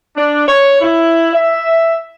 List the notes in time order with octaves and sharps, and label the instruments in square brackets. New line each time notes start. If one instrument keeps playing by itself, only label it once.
[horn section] D4
C#5
E4
E5